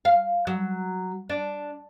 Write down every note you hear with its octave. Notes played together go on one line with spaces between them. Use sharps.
F5
F#3
D4